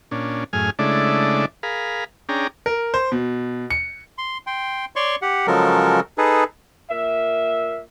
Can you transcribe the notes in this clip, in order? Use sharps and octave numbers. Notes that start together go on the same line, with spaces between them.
A#2 C#4 D4
F#2 A2 G#4 G#5 F6
C#3 G#3 A3 D4 E4 D5
G#4 A#4 F5 B5
C#4 D4 G#4 G5 A#5
A#4
C5
B2
C#7
C6
G5 C6
C#5 D5 C6 C#6
G4 F#5
C#3 F3 F#3 G#3 A4 A#4
D#4 G#4 A4 B4
A#2 A#3 E5